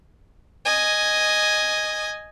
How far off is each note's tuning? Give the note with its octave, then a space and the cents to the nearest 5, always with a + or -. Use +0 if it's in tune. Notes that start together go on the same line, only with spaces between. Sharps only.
D#5 +0 G#5 +0